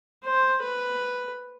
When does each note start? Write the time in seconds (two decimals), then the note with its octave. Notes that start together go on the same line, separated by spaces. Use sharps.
0.25 C5
0.62 B4